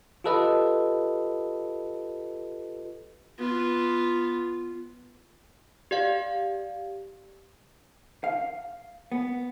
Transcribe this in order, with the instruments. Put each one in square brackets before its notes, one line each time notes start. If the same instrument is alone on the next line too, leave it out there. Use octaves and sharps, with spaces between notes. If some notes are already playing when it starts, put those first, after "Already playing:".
[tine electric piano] F4 G4 A4 B4 D#5
[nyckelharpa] B3 F4
[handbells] G4 D5 F5
[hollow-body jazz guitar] F5
B3